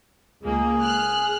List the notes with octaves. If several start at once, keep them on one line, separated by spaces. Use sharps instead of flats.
C#2 A#3 G#4
F6 F#6